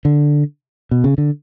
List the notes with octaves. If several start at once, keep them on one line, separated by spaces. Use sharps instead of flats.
D3
B2
C#3
D3